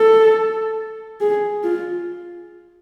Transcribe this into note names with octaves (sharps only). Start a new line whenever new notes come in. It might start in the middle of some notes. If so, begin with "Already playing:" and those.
Already playing: A4
G#4
F4